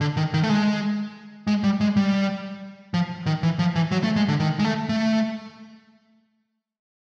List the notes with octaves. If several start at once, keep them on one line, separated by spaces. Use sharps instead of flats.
D3
D#3
D#3
A3
G#3
G#3
G3
G#3
G3
F3
D#3
E3
F3
E3
F#3
A3
G#3
D3
D#3
G#3
A3
A3